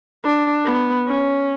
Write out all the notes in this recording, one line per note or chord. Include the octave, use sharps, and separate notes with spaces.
D4
B3
C#4